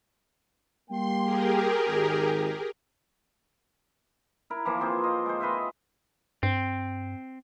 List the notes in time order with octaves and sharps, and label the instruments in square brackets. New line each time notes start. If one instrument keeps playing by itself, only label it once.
[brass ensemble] G3 A#3 G5 [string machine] C6
[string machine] G4 G#4 A#4
[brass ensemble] G#1 D#3
[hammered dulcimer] E4 A#4
E3 F3 A#3
C4 F4 G#4 C5
D#5
G#3 C5
F4 B4 D#5 E5
[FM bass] G2 [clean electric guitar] C4